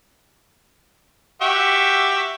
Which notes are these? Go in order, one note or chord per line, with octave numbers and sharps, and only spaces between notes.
F#4 G4 E5